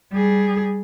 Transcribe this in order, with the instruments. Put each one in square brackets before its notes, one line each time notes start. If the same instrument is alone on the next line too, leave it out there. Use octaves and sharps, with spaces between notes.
[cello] G3 G#4